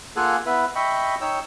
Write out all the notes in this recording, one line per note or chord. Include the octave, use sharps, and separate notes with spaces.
A#3 F4 G#4 A4 F#5 G#5
B3 E4 B4 E5
D#5 E5 G5 B5 C#6
D#4 C#5 G5 E6